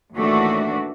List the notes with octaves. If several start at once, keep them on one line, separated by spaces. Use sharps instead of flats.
D#2 A2 E3 A3 D4 F#4